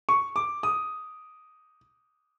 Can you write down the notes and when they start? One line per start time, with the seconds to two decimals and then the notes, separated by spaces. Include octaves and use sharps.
0.09 C#6
0.36 D6
0.63 D#6